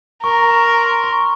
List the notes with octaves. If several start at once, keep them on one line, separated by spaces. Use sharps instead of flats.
A#4 C#6
A#5
C6
C#6